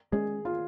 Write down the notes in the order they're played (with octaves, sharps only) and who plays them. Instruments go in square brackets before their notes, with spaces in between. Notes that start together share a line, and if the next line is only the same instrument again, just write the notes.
[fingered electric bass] G#3 C#4 [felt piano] G#4
[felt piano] F4